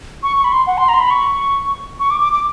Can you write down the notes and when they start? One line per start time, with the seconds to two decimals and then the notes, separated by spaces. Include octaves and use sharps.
0.23 C#6
0.36 C#6
0.44 B5
0.52 C6
0.67 F#5
0.78 C6
0.89 A#5
0.94 C6
1.00 B5
1.10 C#6
1.99 C#6
2.10 D6
2.21 D6
2.33 D6